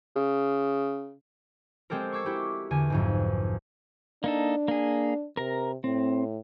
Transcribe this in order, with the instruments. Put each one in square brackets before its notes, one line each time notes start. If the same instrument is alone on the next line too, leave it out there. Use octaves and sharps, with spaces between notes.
[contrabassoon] C#3
[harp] G#3 C4 G4 A4 A#4
C#6 D6 E6 G#6 C7
G#3 E4 F#4 G4
E2 D3 G#5
B1 F2 G#2
[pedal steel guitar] A#3 D#4 A4 [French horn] D4
[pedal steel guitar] A#3 G#4
[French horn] C3 [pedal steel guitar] A#4 A#5
[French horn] A2 [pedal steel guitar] C4